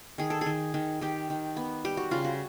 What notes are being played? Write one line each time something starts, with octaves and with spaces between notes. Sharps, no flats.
D#3 G#4
A4
D#3 G#4
D#3
D#3 G4
D#3
B3
G3 G4
F#4
C#3 F4
F#4